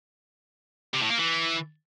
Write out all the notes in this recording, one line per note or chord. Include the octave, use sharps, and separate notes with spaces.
C3
A2
A#3
E3